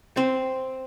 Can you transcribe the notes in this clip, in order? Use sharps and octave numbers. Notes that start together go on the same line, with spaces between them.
C4